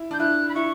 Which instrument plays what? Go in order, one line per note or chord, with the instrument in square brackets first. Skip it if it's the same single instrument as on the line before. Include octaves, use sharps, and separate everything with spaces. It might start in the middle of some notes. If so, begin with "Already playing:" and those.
Already playing: [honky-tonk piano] E4
[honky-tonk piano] D4 [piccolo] G6
[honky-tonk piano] E4 [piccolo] F#6
[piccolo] B5
[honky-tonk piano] E4 [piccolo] C#6